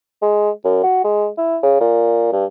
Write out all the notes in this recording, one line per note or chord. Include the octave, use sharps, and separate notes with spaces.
G#3
F#2
F#4
G#3
E4
C#3
A#2
G2